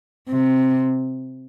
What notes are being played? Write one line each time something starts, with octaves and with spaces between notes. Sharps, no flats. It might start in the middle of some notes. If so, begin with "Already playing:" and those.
C3